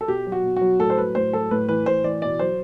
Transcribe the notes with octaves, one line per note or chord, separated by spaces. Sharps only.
A4
B2 G4
F#3
F#4
B2
F#3 F#4
A2 A4
C5
F#3 B4
A2 C5
F#3 A4
A2 B4
E3 B4
A2 C5
E3 D5
B2 D5
F#3 C5